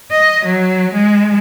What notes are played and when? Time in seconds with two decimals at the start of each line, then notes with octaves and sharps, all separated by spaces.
0.11 D#5
0.45 F#3
0.93 G#3